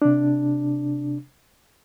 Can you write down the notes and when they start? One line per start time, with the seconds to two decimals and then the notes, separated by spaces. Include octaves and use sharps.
0.02 C3 D4